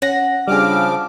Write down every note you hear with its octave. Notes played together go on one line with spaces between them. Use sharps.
C#4 F#5 A#6
C#3 F3 G3 D4 G#4 D6 F6